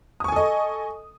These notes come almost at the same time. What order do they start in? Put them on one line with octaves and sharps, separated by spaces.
D#6 C#6 G#5 A4 D#5